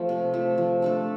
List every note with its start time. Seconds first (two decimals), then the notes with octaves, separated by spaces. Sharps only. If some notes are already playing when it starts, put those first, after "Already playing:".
Already playing: F3 A3 C4
0.09 C3
0.34 F3 A3
0.58 F3
0.82 A3 D4 A4